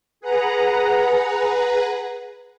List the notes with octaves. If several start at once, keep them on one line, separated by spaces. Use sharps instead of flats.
G#4 B4 F#5 A#5